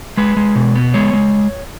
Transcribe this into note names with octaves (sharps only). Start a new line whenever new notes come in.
G#3 B4
G#3
B2
B3
G#3 C#5
G#3